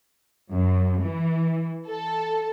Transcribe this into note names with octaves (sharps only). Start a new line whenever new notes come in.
F#2
E3
A4